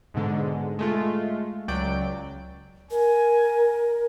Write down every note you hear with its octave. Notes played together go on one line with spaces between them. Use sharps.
G#2 B2 D3 G#3
G#3 A3 F4
C#2 F#3 D5 G5 D7
A#4 G#5